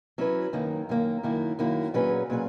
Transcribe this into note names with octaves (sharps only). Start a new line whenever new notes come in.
F#3 C#4 E4 B4
F#2 D#3 A#3
F#2 D#3 A#3
F#2 D#3 A#3 E4
F#2 D#3 A#3 E4
A#2 F#3 C#4 G#4 B4
A#2 F#3 C#4 G#4 B4